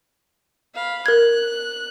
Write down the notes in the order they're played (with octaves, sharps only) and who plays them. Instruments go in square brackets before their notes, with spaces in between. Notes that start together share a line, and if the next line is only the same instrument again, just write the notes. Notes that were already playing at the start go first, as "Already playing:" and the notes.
[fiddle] F5 B5
[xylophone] A#4 G#6 [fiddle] F#6